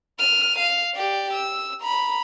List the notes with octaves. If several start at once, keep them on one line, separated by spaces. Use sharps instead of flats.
F6 D#7
F5
G4 D5
E6
A#5 B5